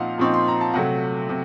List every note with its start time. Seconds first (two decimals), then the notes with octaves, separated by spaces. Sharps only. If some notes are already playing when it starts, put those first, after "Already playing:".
Already playing: A#2 F3 C4 D#4 F5 F#5
0.18 A#2 F3 C4 D#4 C#6
0.34 C6
0.48 A#5
0.61 A5
0.74 C3 F#3 A3 F#5
1.29 C3